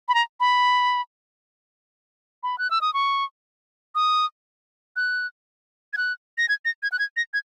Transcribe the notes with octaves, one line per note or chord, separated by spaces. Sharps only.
B5
A#5
B5
B5
F#6
E6
D#6
C#6
D#6
F#6
G#6
F#6
A#6
G#6
A#6
G#6
F#6
G#6
A#6
G#6